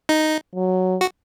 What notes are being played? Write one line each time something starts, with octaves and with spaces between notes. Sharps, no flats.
D#4
F#3
F#4